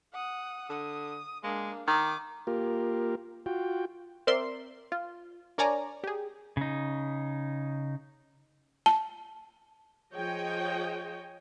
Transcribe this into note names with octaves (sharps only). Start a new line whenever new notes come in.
F#5 D#6
D3 D#6
G#3 A#3 D4
D#3 D6 D#6
A#3 F4 G4 A#4
F4 F#4 G5
C4 A#4 D5 E5 C6
F4
D4 A#4 C#5 D5 G#5 A#5
G4 G#4
C#3 D#4
A5
F3 G#4 C#5 D#5 G5